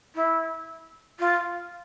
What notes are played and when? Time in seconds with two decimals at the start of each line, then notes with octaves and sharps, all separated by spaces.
0.15 E4
1.19 F4